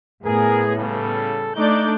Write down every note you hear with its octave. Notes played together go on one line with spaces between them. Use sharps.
A2 B3 G#4 A#4
C#3 G3 A4
A3 D4 D#4 D5 D6 G6